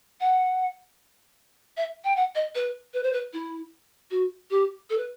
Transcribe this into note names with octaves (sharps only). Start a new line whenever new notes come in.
F#5
E5
G5
F#5
D#5
B4
B4
C5
B4
E4
F#4
G4
A4
B4